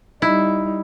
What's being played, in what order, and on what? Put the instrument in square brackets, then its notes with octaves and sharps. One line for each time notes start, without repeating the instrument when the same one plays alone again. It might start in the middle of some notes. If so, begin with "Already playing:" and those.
[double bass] G3 D#4 [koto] E4